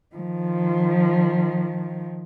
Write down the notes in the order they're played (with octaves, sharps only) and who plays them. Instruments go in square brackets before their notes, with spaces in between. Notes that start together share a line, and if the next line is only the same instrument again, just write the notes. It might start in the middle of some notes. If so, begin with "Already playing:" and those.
[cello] D#3 F3